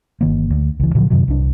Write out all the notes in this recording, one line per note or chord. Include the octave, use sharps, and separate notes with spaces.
G1 D#3 A#3
D2
C#2 E3
A#2 D3 F3 F#3
F#2 C3 D#3 F#3
C2 D4